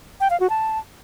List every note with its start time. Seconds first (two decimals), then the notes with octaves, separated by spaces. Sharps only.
0.20 G5
0.30 F5
0.40 F#4
0.50 A5